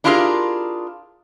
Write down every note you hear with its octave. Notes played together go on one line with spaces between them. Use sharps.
D4 E4 F4 G4 G#4 A#4